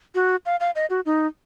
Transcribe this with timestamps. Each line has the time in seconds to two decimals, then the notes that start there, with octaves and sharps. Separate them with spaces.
0.15 F#4
0.46 F5
0.60 F5
0.75 D#5
0.90 F#4
1.06 D#4